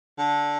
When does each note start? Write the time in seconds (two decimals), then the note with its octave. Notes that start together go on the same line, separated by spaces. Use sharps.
0.18 D3